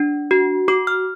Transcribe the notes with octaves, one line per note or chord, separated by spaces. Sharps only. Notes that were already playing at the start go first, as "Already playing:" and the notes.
Already playing: D4
F#4
F#4 D6
F6